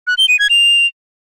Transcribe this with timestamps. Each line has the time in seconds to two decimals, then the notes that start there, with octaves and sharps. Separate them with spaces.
0.07 F#6
0.18 G7
0.29 D#7
0.39 G#6
0.50 F7